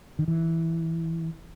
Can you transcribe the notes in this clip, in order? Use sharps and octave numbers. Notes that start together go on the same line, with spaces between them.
D#3
E3